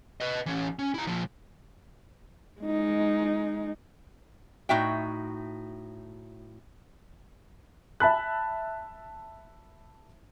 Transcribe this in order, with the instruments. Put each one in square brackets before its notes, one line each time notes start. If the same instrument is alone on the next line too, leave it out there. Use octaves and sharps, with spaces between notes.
[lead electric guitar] B4 D#5
E3 C#4
C#4
E4 A#5
A#2 F3
[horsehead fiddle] G#3 D#4
[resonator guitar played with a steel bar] A2 D#4 F#4 E5 G5
[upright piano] E5 A5 B5 F#6